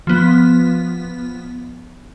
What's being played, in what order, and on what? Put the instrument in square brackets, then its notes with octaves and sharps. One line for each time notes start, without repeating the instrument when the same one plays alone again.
[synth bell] F3 B3